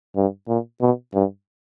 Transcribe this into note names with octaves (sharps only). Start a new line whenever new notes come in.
G2
A#2
B2
G2